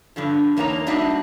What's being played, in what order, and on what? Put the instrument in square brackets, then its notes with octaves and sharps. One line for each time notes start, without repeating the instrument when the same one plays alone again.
[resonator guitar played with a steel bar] G2 D3 F3
E2 A#3 D#4 F4 C#5 A#5
G3 A#3 D4 D#4 F#4 E5